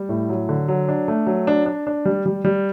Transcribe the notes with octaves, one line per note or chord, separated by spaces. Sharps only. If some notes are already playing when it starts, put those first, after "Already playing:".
Already playing: G3
A2
F#3
D3
F#3
D4
A3
F#3
D4
D4
D4
G3
G3
G3